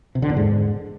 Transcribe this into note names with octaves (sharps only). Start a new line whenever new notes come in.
C3
D3
E2
G#2